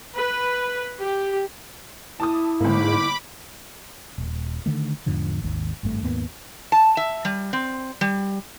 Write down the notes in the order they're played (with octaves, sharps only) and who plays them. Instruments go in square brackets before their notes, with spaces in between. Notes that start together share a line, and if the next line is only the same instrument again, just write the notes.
[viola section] B4
G4
[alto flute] E4 [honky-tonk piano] A5 D6 D#6
[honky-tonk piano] G1 A#3 [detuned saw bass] G#2 [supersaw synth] B5 D6
[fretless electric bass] D#1
D3 D#3 A3
E2 G#2 D3 F3
G#1 D#2
G#1 G2 D3 A3
D#2 G#2 A#3 B3
[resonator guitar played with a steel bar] A5
E5
G3
C4
G3